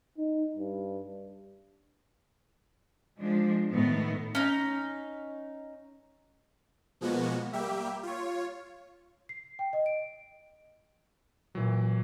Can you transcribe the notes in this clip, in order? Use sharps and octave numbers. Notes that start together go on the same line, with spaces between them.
D#4
G2
F3 G#3 D4
A2 D#3 A3 B3
C#4 D#4
B2 F3 G#3 A#3 B3 F#4
G3 A#3 G4 E5
F4 C#5
C7
G5
D#5
D7
A#2 E3 F#3